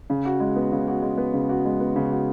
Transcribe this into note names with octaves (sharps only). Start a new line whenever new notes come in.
C#3
F#4
G#3
B3
C#3
F#4
G#3
B3
C#3
F#4
G#3
B3
C#3
F#4